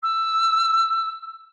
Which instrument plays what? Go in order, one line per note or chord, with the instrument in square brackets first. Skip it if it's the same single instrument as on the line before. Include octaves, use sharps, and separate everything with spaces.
[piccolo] E6